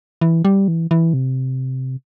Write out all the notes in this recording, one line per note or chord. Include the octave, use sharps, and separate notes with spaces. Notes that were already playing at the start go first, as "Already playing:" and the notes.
E3
G3
E3
E3
C3